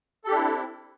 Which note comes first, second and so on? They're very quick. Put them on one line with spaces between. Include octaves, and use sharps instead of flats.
A4 G4 D4 E4 C4